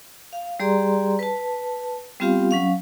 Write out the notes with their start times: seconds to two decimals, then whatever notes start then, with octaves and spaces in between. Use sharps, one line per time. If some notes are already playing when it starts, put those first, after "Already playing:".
0.33 F5
0.60 G3 G4 G#4 D5 A#5 C6
1.19 B4 A5
2.20 G3 B3 C4 F4 G4 F5
2.51 F#3 C#4 F5